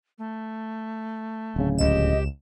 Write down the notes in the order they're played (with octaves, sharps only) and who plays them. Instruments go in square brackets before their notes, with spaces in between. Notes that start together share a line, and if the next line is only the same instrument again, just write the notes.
[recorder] A3
[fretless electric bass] D1 C#3
[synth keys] C#2 E7 [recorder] G4 [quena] D#5